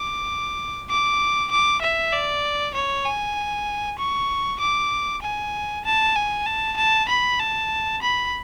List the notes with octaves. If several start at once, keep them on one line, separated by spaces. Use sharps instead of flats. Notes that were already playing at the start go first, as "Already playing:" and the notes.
Already playing: D6
D6
D6
E5
D5
C#5
G#5
C#6
D6
G#5
A5
G#5
A5
A5
B5
A5
B5